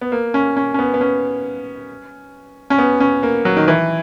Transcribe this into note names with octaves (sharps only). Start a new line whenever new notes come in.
B3
A#3
C#4
C#4
C#4
B3
B3
C#4
C#4
B3
C#4
A#3
F#3
D#3
E3